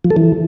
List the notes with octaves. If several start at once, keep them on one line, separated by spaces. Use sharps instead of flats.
F3
A4
E3